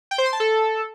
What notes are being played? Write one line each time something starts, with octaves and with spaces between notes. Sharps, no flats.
G5
C5
C6
A5
A4